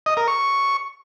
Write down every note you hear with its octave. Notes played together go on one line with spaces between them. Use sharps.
D#5
A#4
C#6